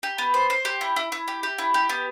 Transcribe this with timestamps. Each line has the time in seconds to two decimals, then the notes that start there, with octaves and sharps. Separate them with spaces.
0.03 G4
0.18 B3
0.34 C5
0.50 C5
0.65 G4
0.81 E4
0.96 E4
1.12 E4
1.28 G4
1.43 G4
1.58 E4
1.74 G4
1.89 B3